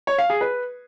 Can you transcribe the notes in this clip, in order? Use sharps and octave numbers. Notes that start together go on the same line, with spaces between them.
C#5
F5
G#4
B4